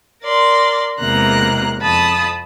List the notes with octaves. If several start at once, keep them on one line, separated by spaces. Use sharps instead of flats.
A#4 D5 C6
E2 C3 G#3 A#3 A#5 F#6
F2 A5 B5 D#6